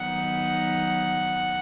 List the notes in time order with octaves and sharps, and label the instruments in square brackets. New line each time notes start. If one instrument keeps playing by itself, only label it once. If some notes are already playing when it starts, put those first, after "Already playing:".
Already playing: [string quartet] D#3 F#3 B3 D#4 F#5